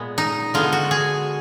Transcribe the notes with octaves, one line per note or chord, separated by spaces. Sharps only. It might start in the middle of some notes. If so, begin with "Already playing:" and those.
Already playing: A#2 G#3 B3
D#4
D3 G#3 B3 F4
F#4
G#4